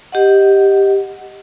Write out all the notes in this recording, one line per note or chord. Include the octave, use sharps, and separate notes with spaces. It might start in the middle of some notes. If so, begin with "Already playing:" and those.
G4 D#5 F#5